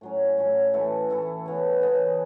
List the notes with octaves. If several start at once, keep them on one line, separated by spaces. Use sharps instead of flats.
A2 F#3 C#4
A2 F#3 C#4
E3 A3 E4 A4
E3 A3 E4 A4
C#3 E3 B3
C#3 E3 B3